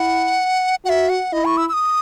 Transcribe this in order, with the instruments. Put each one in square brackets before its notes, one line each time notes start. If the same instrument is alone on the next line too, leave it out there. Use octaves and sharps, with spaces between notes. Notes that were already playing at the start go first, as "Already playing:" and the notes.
Already playing: [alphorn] E4 [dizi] F#5
[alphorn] F#4 [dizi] F#5
[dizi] E5
F#5
[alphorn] E4 [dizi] D#5
[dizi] C#6
E6
E6
D#6